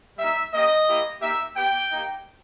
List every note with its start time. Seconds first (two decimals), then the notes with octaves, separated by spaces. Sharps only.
0.18 G3 A#3 D#4 E5
0.53 A#3 C#4 G4 D#5
0.87 A#3 E4 G4
1.21 A#3 D#4 G4 E5
1.55 B3 G4 G5
1.90 A#3 D#4 G4